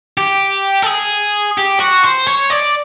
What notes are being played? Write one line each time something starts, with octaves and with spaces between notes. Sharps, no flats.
G4
A4
G#4
G4
F#4
C5
C#5
D5